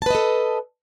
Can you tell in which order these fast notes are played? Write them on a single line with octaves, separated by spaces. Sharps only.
A5 B4 D#5 A4